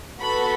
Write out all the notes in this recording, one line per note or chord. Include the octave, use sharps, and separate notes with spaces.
B3 F#4 A4 B5